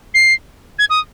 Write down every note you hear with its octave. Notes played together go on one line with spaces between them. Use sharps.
C7
G#6
D#6